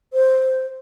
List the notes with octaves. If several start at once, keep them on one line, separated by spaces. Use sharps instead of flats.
C5